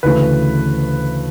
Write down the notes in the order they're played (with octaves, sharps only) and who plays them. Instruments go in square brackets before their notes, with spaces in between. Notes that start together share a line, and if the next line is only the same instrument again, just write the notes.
[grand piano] D2 C#3 E3 A3 B4